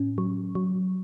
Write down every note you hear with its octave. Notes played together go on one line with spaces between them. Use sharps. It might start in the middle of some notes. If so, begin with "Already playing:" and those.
Already playing: A2 C#4
F#3
F#3